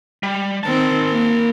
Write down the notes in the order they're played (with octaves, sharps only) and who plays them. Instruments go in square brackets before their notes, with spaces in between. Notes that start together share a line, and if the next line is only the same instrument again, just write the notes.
[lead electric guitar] G3
[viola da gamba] D#3 C4 [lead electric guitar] A#4 A5
[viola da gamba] A#3